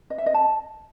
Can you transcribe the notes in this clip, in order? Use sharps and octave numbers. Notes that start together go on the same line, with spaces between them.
D#5
E5
D#5
A5